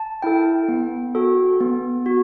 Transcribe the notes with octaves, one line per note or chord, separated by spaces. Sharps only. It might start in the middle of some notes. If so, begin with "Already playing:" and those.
Already playing: A5
E4 A4 G5
B3
F#4 A4
B3
F#4